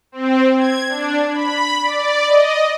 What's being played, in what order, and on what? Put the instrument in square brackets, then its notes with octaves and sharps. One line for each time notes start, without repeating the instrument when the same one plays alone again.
[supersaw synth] C4
G#6
D4
B5
D5
D#5